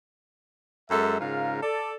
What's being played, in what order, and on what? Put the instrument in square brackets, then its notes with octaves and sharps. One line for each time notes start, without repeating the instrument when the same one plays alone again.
[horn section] F#2 G#3 A4 E5
G#2 C#3 F4 A#4 F5
A4 D5